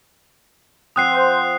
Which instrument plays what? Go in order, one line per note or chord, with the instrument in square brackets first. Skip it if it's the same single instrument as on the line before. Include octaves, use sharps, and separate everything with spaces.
[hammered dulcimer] F3 C4 F#5 [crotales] D#6 F#6 C7
[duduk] C5